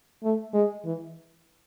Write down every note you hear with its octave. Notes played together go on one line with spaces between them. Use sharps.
A3
G#3
E3